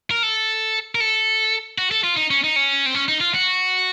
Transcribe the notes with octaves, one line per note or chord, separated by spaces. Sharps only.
A#4
A4
A#4
A4
F#4
A4
F4
D#4
C#4
D#4
C#4
C4
C#4
D#4
F4
F#4